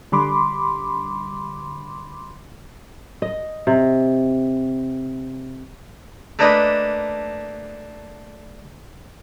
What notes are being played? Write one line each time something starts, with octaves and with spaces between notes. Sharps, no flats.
D3 G3 B5 C6 D6
D#5
C3
A3 A#3 D4 B4 D#5